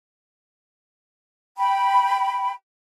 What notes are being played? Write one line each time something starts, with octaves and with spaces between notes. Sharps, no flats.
G5 B5